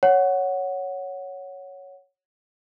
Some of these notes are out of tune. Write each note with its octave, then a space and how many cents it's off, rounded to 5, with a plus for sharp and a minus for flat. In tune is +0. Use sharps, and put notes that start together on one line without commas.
C#5 +0 F#5 +0